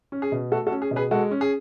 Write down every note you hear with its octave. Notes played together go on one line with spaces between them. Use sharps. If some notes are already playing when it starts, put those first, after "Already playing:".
C#4
G#4
B2
A3 F#4 A4
F#4 A4
C#4
G#4
B2
G#4 B4
G#3 F#4 A4
C#4
G#4